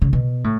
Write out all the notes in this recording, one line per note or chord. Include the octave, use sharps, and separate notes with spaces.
C#3
B2
A2